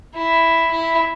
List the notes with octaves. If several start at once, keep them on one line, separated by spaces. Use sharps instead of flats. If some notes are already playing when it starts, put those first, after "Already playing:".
E4
E4